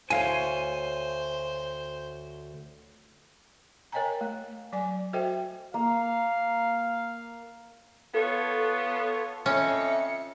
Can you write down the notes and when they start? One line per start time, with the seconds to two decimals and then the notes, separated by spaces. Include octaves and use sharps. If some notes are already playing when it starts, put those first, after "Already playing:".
0.10 D2 C5 C#5 F5 G#5
3.92 A#4 C#5 D#5 G5 G#5 A#5
4.21 A3
4.73 F#3 D5 G#5
5.13 F#4 A4 C5 D#5 E5 G5
5.74 A#3 F5
8.14 B3 F4 A4 C#5
9.46 F2 D3 C#4 D#5 E5 C#7